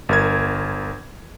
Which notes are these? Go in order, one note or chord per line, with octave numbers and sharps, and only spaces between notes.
G1 A#4 G#6